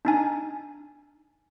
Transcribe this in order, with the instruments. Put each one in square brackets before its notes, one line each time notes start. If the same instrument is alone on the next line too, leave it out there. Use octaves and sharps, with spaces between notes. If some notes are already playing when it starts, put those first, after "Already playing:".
[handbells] D4 D#4 G#5